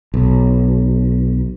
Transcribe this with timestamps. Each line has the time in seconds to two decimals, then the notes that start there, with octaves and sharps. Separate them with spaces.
0.14 B1